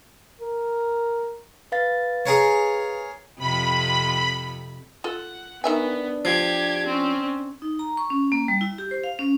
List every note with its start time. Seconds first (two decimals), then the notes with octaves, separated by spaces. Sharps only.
0.40 A#4
1.72 B4 F5 A6
2.26 G#4 A#4 C#5
3.39 F2 C3 B5
5.04 F4 A4 F#5
5.64 D#3 B3 D4 E5 G#5
6.25 F3 G4 G#6
6.87 C4 C#4
7.62 D#4
7.79 A#5
7.97 C#6
8.10 C#4
8.32 A#3
8.48 G3
8.61 E4
8.78 G4
8.91 C5
9.04 F5
9.19 C#4